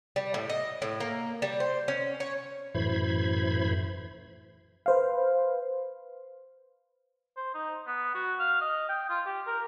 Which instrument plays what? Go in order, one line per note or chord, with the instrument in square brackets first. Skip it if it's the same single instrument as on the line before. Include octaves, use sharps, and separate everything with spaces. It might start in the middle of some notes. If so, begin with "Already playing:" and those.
[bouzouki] G3
A2
D#5
A2
A#3
G3
C5
C#4
C#5
[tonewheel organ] F#2 A2 E3 C5 B5 G#6
[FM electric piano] B4 C5 F5
[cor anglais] C5
D#4
B3
F#4
F5
D#5
G5
F4
G4
A#4